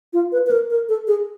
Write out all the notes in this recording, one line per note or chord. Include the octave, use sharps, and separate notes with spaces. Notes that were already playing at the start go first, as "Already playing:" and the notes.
F4
B4
B4
A#4
A#4
A4
G#4